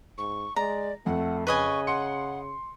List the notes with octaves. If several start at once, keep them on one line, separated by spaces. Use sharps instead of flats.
G#2 C#6
G#3 D5 A#5
F2 A3 F#5
C#3 B4 D#5 G#5 C#6
F#5 C6 C#7